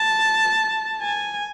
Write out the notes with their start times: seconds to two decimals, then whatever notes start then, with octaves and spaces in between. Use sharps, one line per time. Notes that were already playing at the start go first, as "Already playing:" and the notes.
Already playing: A5
1.02 G#5